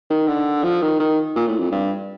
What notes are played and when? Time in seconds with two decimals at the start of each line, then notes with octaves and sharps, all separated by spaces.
0.10 D#3
0.28 D3
0.63 F3
0.82 D#3
1.00 D#3
1.36 A#2
1.47 A2
1.59 F2
1.71 G2